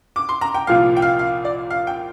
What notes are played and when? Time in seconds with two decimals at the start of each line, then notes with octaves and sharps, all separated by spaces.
0.16 D6
0.29 C6
0.41 A#5
0.54 G5
0.67 C2 A#2 F3 A#3 F4 F5
0.97 G5
1.02 F5
1.19 F5
1.45 D5
1.70 F5
1.87 G5